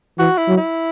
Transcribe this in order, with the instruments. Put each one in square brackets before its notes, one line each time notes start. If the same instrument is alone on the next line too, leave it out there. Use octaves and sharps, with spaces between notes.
[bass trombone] E3 [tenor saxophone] F#4
[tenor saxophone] E4
[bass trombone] F#3
[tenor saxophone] E4